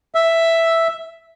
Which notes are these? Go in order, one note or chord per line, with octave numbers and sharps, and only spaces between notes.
E5